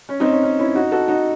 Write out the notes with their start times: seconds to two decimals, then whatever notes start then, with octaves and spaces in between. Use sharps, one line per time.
0.09 C#4
0.20 C4 D#4
0.32 C#4
0.43 C#4
0.59 C#4 E4
0.75 D#4 F#4
0.92 F#4 A4
1.08 D#4 F#4